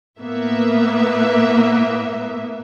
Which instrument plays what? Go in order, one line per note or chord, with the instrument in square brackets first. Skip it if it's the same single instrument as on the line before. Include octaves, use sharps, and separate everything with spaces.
[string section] A2 A#3 B3 E5